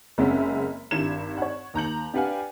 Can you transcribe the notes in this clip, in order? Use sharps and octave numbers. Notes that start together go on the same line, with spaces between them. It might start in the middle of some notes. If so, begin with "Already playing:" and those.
F#1 G#3 C4 C#4 F#4 E5
G#1 G2 E4 G#6 E7
C#5 F#5
D#2 A#5 G6 F#7
D4 G4 B4 F5 F#5 G#5